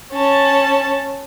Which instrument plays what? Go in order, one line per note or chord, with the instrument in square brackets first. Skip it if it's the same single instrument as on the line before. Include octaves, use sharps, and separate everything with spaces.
[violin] C#4 A5